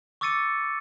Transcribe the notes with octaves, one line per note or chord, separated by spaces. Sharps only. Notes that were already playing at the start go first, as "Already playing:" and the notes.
C#6 D6 E6 A6 C#7 D#7